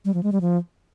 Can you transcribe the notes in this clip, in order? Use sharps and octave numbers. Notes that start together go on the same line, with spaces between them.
G3
F3
G#3
G3
F3